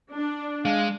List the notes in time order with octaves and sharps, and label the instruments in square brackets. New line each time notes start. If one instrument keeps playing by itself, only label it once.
[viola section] D4
[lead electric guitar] G#3 [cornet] F5